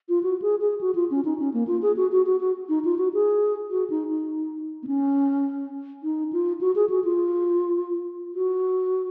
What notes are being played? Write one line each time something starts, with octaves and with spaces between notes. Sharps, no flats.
F4
F#4
G#4
G#4
F#4
F4
C#4
D#4
C#4
A#3
F4
G#4
F#4
F#4
F#4
F#4
D#4
F4
F#4
G#4
F#4
D#4
D#4
B3
C#4
D#4
F4
F#4
G#4
F#4
F4
F#4